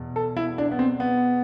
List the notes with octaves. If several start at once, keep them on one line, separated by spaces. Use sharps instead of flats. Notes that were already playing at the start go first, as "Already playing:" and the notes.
Already playing: E2 B2
A4
E4
D4
B3
C4
B3